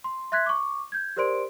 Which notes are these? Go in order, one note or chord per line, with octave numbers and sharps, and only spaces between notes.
C6
E5 C6 F#6 G#6 B6
C#6 D6
G6 G#6
G4 A#4 C5 D5 C6 D7